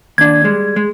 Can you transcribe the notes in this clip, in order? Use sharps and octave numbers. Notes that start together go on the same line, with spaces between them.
D#2 D4 G#6
G3 G#3
G#3